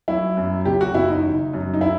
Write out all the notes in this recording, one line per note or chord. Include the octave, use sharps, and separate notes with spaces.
F#3 E4
F#2
F#1 G4
F#4
F#1 E4
D#4
D#3
F#2
D#4
E4